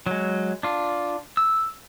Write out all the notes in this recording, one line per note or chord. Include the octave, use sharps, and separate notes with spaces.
F#3 G#3
D4 F4
E6